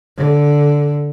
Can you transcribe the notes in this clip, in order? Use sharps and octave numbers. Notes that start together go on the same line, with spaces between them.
D3